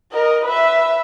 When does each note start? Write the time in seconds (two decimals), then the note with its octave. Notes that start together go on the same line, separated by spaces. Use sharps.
0.12 A#4 D#5
0.45 B4 E5